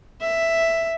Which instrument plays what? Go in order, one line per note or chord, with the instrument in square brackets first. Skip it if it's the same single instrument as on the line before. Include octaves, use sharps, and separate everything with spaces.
[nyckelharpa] E5